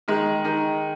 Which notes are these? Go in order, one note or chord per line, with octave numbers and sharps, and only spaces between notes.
D#3 G#3
D#3